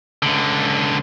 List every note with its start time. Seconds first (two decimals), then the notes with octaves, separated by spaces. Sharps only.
0.23 C#2 D3